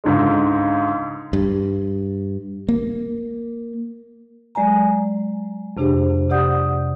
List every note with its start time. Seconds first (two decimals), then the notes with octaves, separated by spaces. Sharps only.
0.04 C#2 G#2 D3 G#3
1.33 G2
2.69 A#3
4.55 F#3 G#3 D5 G#5 A#5
5.77 F2 C3 D4 G4 G#4 C5
6.30 C3 G4 D5 F#5 D#6 G6